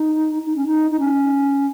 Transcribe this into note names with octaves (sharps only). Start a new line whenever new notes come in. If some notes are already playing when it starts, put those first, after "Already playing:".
Already playing: D#4
D#4
C#4
D#4
D#4
C#4